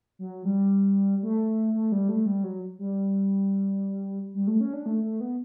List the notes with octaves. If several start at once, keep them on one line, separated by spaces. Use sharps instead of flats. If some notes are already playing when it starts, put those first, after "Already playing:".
F#3
G3
A3
A3
G3
A3
G3
F#3
G3
G3
A3
C#4
D4
A3
A3
B3